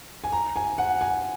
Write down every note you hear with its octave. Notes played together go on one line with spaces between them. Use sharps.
G#5
A#5
G#5
F#5
G#5